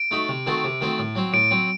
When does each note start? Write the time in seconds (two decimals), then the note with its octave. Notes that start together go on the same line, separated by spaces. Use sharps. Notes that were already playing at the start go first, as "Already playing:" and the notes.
Already playing: D7
0.11 A3 D#4 F#4
0.29 C3
0.46 D#3 A3 C4 F#4
0.64 C3
0.81 D#3 A3 C4 F#4
0.99 A2
1.15 F#3 C4
1.33 A2 D7
1.51 F#3 C4